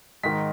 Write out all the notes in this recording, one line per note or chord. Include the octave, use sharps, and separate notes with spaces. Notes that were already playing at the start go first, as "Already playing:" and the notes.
G#2 D#3 B6